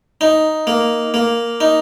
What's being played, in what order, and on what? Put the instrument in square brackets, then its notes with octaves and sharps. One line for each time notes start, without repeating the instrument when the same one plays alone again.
[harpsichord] D#4
A#3
A#3
D#4